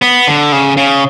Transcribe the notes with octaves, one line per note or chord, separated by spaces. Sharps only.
B3
D3
C#3
C#3